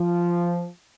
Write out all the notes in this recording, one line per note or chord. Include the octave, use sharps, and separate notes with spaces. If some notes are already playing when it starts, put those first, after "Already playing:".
Already playing: F3